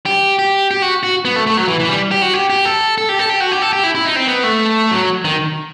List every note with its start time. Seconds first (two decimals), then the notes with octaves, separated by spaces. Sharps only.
0.06 G4
0.39 G4
0.71 G4
0.82 F#4
1.03 F#4
1.25 B3
1.36 A3
1.47 A3
1.57 F#3
1.68 E3
1.80 E3
1.89 G3
2.11 G4
2.22 F#4
2.34 G4
2.50 G4
2.65 A4
2.98 A4
3.09 G4
3.19 A4
3.30 G4
3.40 F#4
3.52 G4
3.62 A4
3.73 G4
3.83 E4
3.95 E4
4.05 D#4
4.16 C4
4.27 B3
4.43 A3
4.91 F#3
5.25 D#3